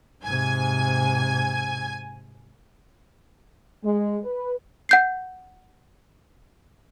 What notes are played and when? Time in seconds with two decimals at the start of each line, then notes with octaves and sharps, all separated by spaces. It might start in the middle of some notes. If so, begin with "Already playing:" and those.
0.24 G#2 C3 G#5 G#6
3.84 G#3
4.23 B4
4.89 F#5 G6 C7